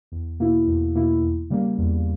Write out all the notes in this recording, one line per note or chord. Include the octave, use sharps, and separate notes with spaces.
E2
B2 A#3 E4
E2
B2 A#3 E4
E2
C#3 G3 A#3
E2